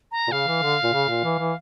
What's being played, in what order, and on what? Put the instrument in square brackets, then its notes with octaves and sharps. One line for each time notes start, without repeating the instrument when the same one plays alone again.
[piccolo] A#5
[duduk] A#2
[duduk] C#3 [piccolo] F5
[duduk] E3
D3
A#2
C#3
A#2
E3
E3